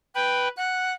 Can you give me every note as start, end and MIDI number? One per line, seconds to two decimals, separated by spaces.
0.15 0.48 71
0.15 0.49 79
0.15 0.48 83
0.57 0.94 78
0.57 0.90 90